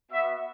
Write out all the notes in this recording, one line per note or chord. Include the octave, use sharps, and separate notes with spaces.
B3 F#4 E5